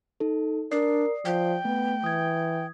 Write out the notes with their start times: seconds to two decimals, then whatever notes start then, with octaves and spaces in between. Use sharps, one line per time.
0.20 D#4 A4
0.71 D4 A#4 D5 D#6 C7
1.25 F3 G5
1.65 A3 B3
2.04 E3 D#6 G#6